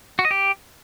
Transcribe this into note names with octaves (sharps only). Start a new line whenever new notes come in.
F#4
D#5
G4